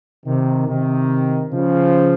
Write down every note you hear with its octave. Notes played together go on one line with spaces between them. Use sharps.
C3 D#3
C3 D#3
C#3 F3